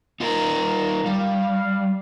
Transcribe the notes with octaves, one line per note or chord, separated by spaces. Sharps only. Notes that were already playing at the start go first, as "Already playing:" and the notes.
D#4 F4 A#4
G3 F5